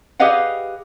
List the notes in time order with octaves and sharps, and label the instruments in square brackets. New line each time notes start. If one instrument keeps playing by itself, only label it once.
[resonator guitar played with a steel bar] G4 G#4 B4 D#5 F5 F#5